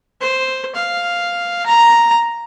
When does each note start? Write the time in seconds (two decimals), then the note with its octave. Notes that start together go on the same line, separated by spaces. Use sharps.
0.21 C5
0.75 F5
1.66 A#5